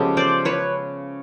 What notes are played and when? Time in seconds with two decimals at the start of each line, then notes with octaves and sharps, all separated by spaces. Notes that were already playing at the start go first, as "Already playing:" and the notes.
Already playing: C#3 F3 G#3 B3 G4 A4
0.17 C5 D5
0.45 B4 C#5